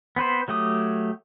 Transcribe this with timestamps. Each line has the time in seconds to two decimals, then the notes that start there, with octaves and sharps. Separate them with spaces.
0.16 B3 C4 B4 C5
0.48 F#3 A3 G4 D#6